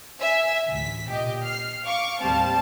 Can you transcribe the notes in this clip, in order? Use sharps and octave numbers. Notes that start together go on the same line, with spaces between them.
E5 G#5
A1 D2 B6
A#2 G4 D#5
F6 C7
F5 C#6 D6
D#2 A2 G3 C4 F5 A5